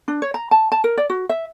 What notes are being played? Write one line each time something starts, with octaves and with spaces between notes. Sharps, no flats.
D4
C#5
A#5
A5
A5
A#4
D5
F#4
E5